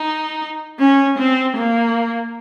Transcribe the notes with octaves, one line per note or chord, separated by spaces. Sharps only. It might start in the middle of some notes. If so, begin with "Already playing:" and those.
Already playing: D#4
C#4
C4
A#3